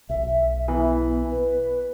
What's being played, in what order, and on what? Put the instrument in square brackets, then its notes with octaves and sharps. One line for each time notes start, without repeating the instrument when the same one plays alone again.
[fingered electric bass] B1 [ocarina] E5
[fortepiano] E3 [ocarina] B3
[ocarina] B4